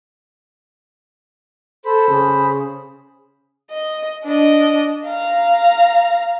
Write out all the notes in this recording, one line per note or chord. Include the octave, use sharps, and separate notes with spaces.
A4 C5 B5
C#3
D#5
D4 D#5
F5 A#5